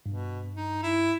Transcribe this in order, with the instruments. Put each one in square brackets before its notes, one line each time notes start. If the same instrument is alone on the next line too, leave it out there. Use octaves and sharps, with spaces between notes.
[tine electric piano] G2 [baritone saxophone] B2
[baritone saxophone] D#4
E4